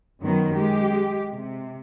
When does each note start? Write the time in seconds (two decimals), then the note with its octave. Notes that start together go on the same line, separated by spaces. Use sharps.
0.21 F#2 D#3 F#3 B3
0.56 G#3 G4
1.32 C3